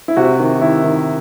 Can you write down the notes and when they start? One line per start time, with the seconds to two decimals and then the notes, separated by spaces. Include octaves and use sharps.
0.08 E4
0.17 C3 F#4
0.39 D#3
0.61 D#3 E4
0.84 D#3